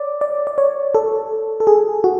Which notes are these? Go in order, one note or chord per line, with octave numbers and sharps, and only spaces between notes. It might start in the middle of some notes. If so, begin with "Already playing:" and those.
Already playing: C#5 D5
D5
D5
C#5
A4
A4
G#4
F#4